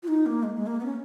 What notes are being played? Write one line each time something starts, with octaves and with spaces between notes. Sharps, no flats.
F4
D#4
A#3
G#3
G#3
A#3
B3
C#4